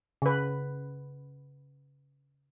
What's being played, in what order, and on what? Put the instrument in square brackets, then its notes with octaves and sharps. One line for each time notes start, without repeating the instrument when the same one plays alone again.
[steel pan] C#3 B4